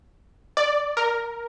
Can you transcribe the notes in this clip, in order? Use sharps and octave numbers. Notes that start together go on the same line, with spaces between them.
D5
A#4